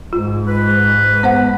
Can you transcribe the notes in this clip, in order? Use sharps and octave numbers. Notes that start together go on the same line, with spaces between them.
G#2 F4
B4
B3 C5 F#5